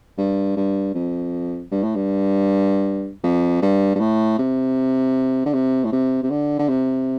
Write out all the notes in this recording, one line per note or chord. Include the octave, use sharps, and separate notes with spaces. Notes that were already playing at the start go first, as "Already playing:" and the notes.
G2
G2
F2
G2
A2
G2
F2
G2
G2
A2
C3
D3
C3
A2
C3
C3
D3
D3
C3